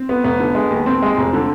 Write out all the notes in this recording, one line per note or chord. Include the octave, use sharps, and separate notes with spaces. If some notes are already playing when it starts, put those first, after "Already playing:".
Already playing: C4
B3
F1 B3
D3
G#3
D#2
D#2 C4
G#3
F1
D3